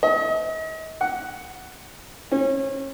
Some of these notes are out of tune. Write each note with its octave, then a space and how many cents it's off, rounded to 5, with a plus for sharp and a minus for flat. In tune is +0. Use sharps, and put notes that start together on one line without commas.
D#5 +40
F#5 +5
C#4 -30